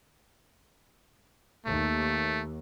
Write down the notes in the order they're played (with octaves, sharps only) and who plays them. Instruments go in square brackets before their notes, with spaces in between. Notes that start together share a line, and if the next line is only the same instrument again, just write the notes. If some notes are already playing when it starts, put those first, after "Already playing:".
[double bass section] D#2 [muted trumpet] A3